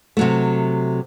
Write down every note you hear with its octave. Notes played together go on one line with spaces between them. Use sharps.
C3 F#3 A3